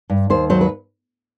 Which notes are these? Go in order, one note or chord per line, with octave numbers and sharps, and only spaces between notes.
G2
D#2 C5
F#3 C5
B4